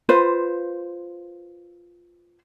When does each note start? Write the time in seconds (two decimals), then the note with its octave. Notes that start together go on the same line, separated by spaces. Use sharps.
0.09 F4 B4 C5